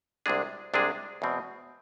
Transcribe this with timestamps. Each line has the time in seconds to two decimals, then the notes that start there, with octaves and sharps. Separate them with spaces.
0.26 C2 C3 G#3 D4 G#4
0.74 C2 C3 G#3 D4 G#4
1.22 E2 B2 G#3 C4